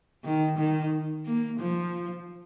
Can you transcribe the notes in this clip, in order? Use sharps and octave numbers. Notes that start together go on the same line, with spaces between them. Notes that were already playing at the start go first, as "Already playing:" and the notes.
D#3
D#3
A#3
F3